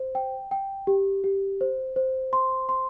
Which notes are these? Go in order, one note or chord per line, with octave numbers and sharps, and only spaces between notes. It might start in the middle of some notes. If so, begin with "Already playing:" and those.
Already playing: C5
G5
G5
G4
G4
C5
C5
C6
C6